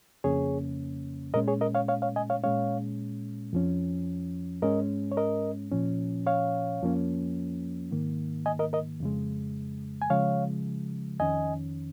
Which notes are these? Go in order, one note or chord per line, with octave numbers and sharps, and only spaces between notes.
F2 C#3 A#3 C#4 G#4 C#5
A#2 G#3 C#4 A#4 D#5
G#4 C#5
A#4 D#5
C#5 F5
C#5 F5
C#5 F5
D#5 G#5
C#5 F5
A#2 G#3 C#4 C#5 F5
F2 F3 C#4
G#2 G#3 C#4 A#4 D#5
C#5
A#4 D#5
A#2 F3 C#4
C#5 F5
F2 F3 A#3 C#4
G#2 D#3 A#3
D#5 G#5
A#4 D#5
A#4 D#5
F2 C#3 G#3
G#5
C#3 F3 G#3 C#5 F5
F2 D#3 C#4 D#5 G#5